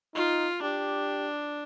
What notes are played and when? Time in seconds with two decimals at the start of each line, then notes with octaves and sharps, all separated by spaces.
0.15 D#4 F4
0.62 D4 G4